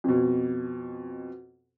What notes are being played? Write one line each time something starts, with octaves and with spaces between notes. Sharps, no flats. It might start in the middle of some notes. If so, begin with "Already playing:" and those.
F2 B2